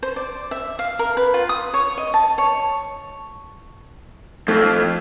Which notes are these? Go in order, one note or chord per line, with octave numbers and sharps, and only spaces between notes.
C5
D5
E5
F5
A#4
B4
F4
D#6
C#5
D#5
A5
C#5
F2 A3